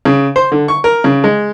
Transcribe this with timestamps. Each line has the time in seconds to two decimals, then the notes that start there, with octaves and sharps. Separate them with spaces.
0.05 C#3
0.36 C5
0.52 D3
0.68 C#6
0.84 A#4
1.04 C#3
1.24 G#3